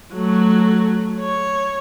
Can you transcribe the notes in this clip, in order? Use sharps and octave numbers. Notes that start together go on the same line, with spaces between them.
F#3 A3
C#5